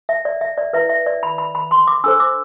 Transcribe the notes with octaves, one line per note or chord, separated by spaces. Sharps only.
E5
D5
E5
D5
E4 B4 E5
E5
D5
B5
B5
B5
C6
D6
D4 A4 C5 E6
D6